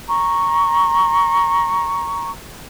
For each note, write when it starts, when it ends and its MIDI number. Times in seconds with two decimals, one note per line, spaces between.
0.07 2.30 82
0.07 2.30 85